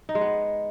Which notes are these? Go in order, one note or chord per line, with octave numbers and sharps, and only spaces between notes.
D#4
G#3
B3